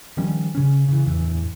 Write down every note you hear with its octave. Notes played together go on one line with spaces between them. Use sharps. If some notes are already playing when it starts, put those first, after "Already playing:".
D#3 F3 G3 C#4
C#3 C#4
C#3 E3
D1 E2 E3